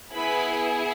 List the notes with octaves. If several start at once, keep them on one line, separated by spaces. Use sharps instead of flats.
B3 E4 G#4 B4 B5